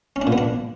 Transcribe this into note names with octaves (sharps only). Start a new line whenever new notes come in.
C#4
D4
A#2
B3
D4